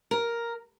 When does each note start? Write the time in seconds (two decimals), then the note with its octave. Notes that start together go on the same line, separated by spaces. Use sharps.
0.11 A#4